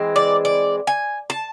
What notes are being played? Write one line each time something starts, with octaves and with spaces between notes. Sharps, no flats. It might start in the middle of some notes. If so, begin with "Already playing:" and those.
Already playing: E3 G#3 C4
D5
D5
G#5
A5